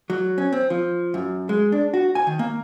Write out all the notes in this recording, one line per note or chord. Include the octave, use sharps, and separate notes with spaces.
F#3
C#4
C4
F3
F#2
G#3
D4
F#4
G#5
D#3
A#3